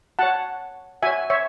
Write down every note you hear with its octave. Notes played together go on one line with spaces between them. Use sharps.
F#4 C#5 F#5 A5
F#4 C#5 E5 G#5
C#5 E5